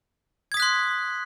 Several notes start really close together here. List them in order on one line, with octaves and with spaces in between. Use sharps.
G#6 D#6 B6 F#6 C6